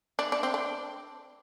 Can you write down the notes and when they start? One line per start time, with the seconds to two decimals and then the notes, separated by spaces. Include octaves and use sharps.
0.19 D4
0.32 D4
0.43 C4
0.54 D4